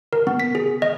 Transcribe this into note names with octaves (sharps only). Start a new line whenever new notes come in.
A#4
B3
B6
G#4
D#5